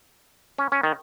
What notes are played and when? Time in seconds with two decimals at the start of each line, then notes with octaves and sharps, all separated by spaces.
0.58 C#4
0.72 C#4
0.83 D#3